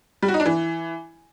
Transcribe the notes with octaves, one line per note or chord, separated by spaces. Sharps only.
G3
F#4
D#4
D4
E3